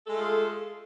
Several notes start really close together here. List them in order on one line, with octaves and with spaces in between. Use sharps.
A4 G#3 A3 F4 G#4